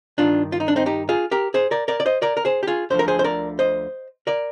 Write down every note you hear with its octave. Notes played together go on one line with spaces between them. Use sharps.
G2 D#3 D4 F4
F4
D#4
D4
C4 D#4
D#4 G4
F4 G#4
G4 A#4
G#4 C5
A#4 D5
A#4 D5
D5
C5 D#5
A#4 D5
A#4
G#4 C5
G4
F4 G#4
D2 D3 F3 C5
A#4
G#4 C5
C5
A#4 D5
C5 D#5
A#4 D5